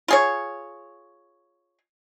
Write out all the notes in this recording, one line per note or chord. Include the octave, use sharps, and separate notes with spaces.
F4 G#4 C#5